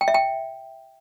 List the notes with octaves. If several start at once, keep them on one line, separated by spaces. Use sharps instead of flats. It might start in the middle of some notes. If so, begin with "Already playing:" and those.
G5
E5
G5